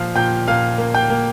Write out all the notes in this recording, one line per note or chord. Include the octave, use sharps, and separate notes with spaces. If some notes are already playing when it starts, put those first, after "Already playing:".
Already playing: A#2 F3 F5 F6
A#2 G5 G6
A#2 F5 F6
A#3
G5 G6
A#3